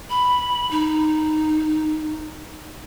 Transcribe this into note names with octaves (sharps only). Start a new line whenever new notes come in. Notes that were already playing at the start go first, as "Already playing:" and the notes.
B5
D#4